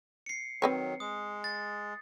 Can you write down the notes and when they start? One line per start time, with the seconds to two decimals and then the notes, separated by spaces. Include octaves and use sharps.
0.26 C7 C#7
0.62 D#3 F#3 C4 B4 C#5
1.00 G#3 D#6
1.44 A6